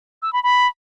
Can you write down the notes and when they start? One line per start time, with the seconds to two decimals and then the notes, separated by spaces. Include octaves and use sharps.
0.22 E6
0.33 B5
0.43 B5